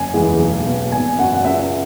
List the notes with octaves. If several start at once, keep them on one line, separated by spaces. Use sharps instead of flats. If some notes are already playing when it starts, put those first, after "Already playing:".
Already playing: F#1 G#5
E2 E3 G#3 B3
B1
B2 B3
G#1 G#5
F#2 F#3 F#5
F#5
C#2 E5